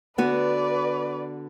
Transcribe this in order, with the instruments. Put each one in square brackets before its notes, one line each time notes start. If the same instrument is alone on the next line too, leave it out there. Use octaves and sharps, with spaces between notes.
[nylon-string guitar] D3 B3 F#4 [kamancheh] B4 D5